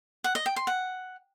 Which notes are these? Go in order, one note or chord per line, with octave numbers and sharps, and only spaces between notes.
F#5
D#5
G5
C6
F#5